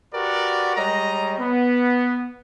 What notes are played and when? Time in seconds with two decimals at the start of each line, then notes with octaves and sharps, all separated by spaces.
0.13 F#4 G4 A#4 B4 D5
0.76 G3 G#3 C#5 D#5 A#5
1.39 B3